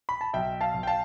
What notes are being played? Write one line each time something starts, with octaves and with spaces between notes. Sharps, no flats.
B5
A5
B1 E5 G5
F5 A5
B1
G5
F5 A5